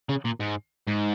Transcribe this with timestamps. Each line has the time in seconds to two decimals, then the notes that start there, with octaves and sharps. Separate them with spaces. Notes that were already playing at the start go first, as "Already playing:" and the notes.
0.09 C#3
0.25 A#2
0.40 G#2
0.88 G#2